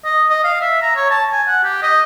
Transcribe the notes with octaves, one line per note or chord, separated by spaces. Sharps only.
D#5
D#5
F5
E5
A#5
C#5
A5
G#5
F#5
G4
D#5